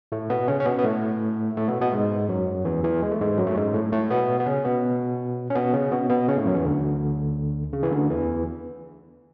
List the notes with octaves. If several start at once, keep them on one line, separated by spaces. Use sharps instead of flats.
A2 A3
B2 B3
C#3 C#4
C#4
B2 B3
B3
A2 A3
A2 A3
B2 B3
B2 B3
G#2 G#3
F#2 F#3
E2 E3
E2 E3
G#3
A3
G#2 G#3
F#2 F#3
A3
G#2 G#3
A2 A3
A2 A3
B2 B3
B3
C#3 C#4
B2 B3
C#4
B2 B3
C#3 C#4
B2 B3
B2 B3
C#3 C#4
A2 A3
F#2 F#3
E2 E3
D2 D3
C#3
E3
D2 D3
E2 E3